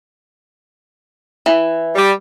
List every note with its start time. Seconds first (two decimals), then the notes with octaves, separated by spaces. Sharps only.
1.46 E3
1.95 G3